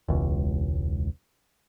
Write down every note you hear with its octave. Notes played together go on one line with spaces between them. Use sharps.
E1 C#2